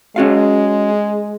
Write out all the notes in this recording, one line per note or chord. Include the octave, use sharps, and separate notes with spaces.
G#3 C#4 F#4 F5